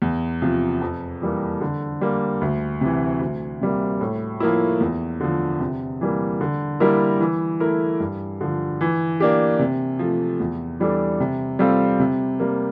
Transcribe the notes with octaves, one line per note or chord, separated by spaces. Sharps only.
E2
C3 F3
F2
E3 G3 A#3
D3
G3 A#3
D2
C3 E3
D2
C3 G3 A#3
A2
F3 A#3 E4
E2
D3 F3
C3
E3 G3 A#3
D3
G3 A#3 E4 A#4
E3
A3 E4 A#4
G2
D3 F3
E3
A#3 D4 G4
C3
F3 A3
E2
E3 G3 D4 A4
C3
G3 C4 F4 A4
C3
G3 A#3